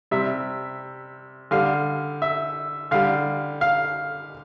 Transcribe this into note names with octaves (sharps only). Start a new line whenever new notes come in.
C3 G3 E5
D3 G3 F5
E5
D3 G3 F5
F5